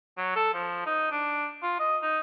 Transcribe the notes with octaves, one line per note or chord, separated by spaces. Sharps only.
F#3
A4
F3
D#4
D4
F4
D#5
D#4